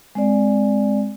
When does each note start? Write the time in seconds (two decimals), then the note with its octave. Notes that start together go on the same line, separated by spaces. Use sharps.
0.15 G#3 C4 D5